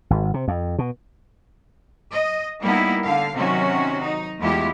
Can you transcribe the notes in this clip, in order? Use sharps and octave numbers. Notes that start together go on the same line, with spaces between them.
G#1
C3
F2
B2
D#5
G3 A#3 B3 D#4 E4
D3 F5
C3 D#3 F#3 C#4 F#4
D#4
E2 G#3 A3 E4 F4 G4